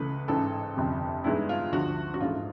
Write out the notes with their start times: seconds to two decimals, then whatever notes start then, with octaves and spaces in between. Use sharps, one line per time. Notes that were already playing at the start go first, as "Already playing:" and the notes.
Already playing: C#2 C#3 E3 A3 B4
0.28 A1 G#2 E3 A4
0.77 G1 F2 C3
1.24 G2 E3 G#3 B3 D#4 E4
1.49 F4
1.73 D2 D3 F3 F#4
2.14 F#4
2.20 A#1 G#2 E3 A3 F4